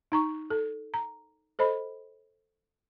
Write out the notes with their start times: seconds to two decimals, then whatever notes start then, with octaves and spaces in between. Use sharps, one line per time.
0.12 D#4 A#5 C#6
0.50 A4
0.94 A#5
1.59 A4 C5 D#5 B5